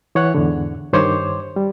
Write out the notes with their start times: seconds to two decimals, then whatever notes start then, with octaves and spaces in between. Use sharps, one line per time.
0.15 E3 C#5 F#5 F#6
0.35 E2 G#2 D3
0.93 G2 D#3 C5 C#5 C6 D6
1.56 G3